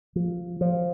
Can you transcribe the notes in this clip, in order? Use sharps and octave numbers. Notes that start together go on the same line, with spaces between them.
F3
F3